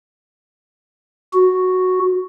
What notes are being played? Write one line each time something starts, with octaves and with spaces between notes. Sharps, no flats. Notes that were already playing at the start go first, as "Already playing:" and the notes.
F#4